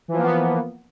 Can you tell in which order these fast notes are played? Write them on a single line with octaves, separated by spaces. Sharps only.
E3 F3 A#3 B3